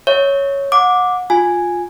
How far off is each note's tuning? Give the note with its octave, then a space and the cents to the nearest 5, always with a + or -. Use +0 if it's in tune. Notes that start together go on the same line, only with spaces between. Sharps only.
C#5 +0 E5 -40
F#5 -30 D6 +0
F4 +15 G#5 +0